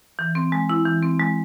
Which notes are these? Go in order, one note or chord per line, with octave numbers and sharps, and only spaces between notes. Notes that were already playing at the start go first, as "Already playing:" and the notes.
E3
C4
G#3
E4
E3
C4
G#3